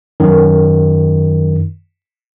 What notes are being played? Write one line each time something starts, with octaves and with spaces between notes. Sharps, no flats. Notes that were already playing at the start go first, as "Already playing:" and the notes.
F#2 D#3